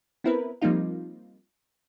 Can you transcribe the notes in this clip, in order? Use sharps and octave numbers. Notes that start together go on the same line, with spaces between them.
B3 C4 E4 A#4 B4
F3 G3 A#3 C4 D#4 F4